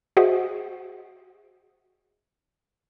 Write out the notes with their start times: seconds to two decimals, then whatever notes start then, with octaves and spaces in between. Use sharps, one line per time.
0.17 F#4 G#4 C5 D#5 E5 F#5